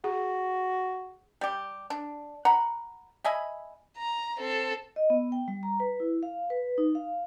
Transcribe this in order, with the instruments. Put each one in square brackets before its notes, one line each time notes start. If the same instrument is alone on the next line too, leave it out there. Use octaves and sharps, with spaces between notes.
[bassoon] F#4 [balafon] G#4
[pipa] G3 G4
D4
F#5 A#5 B5
D#5 E5 G#5 B5
[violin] A#5
C4 A4
[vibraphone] D#5
B3
G5
G3
A#5
B4
E4
F5
B4
D#4
F5